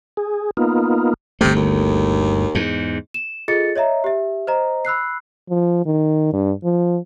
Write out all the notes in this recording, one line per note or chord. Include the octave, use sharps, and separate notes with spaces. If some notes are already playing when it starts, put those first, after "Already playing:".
G#4
A#3 B3 D#4 F4
G1 D2 C3 A3
D#2
E2 G#2
E7
F4 G#4 A4 D#5 A6 C#7
C#5 D#5 E5 A#5
G4 E5
C5 D#5 A#5
B5 E6 F#6 C7
F3
D#3
G2
F3